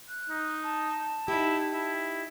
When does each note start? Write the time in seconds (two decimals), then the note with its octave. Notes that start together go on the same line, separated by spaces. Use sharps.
0.09 F#6
0.30 D#4
0.64 A5
1.28 D#4 E4 G4
1.73 E4